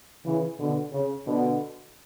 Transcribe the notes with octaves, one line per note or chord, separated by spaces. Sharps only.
C#3 E3
B2 D3
C#3
B2 D3